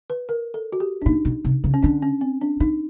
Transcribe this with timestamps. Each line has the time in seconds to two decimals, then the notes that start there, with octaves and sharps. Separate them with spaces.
0.10 B4
0.29 A#4
0.54 A4
0.72 F#4
0.80 G4
1.02 D4
1.06 A#2 D#4
1.25 B2
1.45 C3
1.64 C#3
1.74 C#4
1.83 D3 D4
2.02 C#4
2.21 C4
2.41 D4
2.60 D#3 D#4